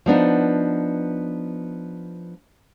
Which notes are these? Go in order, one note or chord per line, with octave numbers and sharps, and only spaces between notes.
F3 B3 D4 D#4